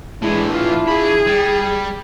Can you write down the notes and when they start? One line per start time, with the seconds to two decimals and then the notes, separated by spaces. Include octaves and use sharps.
0.22 A2 E3 G#3 D4 E4
0.52 F4
0.89 F3 G#4 B5
1.27 G3